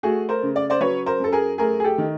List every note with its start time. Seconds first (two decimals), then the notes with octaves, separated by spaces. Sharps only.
0.03 A3 F#4 G#4
0.29 A#4 C5
0.43 C#3
0.56 D5
0.70 C5 D5
0.80 F#3 B4 C#5
1.06 A#4 C5
1.20 F#2 A4
1.32 G#4 A#4
1.58 A3 G#4 A#4
1.80 G#4
1.84 G4 A4
1.98 D#3